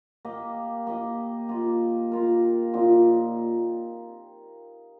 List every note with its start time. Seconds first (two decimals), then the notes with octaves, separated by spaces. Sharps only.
0.25 A#3 G4 D#5
0.87 A#3 G4 D#5
1.49 A#3 F4 D#5
2.12 A#3 F4 A#4
2.74 A#2 F3 C4 D#4